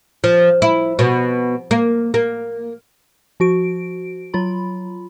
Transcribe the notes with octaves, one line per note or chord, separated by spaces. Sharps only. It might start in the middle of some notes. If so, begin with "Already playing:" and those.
F3
E4
B2
A#3
A#3
F3 F#4 D7
F#3 F4 B5